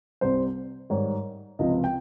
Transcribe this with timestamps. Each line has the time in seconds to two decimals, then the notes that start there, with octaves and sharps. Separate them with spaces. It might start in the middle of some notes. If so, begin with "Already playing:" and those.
0.21 C2 C3 G3 C5
0.90 G#2 D#3 G3 C#5
1.59 C#2 C3 F3 D#5
1.84 G5